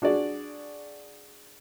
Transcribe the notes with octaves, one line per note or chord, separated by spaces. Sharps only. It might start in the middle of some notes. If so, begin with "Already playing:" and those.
D4 F#4 G#4 D5